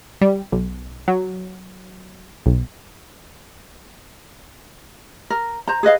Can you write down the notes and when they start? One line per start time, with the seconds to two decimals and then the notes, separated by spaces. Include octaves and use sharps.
0.21 G3
0.52 B1
1.08 F#3
2.46 B1
5.30 A#4
5.67 C5 A#5
5.83 G#4 B4 D#5 F5